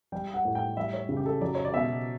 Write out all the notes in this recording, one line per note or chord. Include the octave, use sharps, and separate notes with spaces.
G3 G5
F#5
A2
G5
G3 E5
C#5
C#3
G4
A4
F#3 D5
C#5
D5
B2 E5